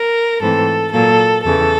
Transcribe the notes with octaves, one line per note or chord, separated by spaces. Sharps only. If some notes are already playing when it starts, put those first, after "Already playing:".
Already playing: A#4
G#2 E3 A3 C4 A4
A#2 F#3 A#3 A4
E2 C#3 E3 A4